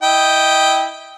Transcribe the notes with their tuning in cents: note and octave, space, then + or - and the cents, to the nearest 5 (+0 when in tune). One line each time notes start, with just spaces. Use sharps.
E4 -15 D#5 +0 G5 +0